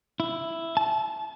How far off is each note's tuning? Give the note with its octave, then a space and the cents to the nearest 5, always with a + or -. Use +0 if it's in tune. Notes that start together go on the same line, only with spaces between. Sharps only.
E4 +5
A5 -30